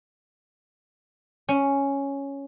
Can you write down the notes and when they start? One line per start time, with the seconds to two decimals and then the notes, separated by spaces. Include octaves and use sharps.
1.49 C#4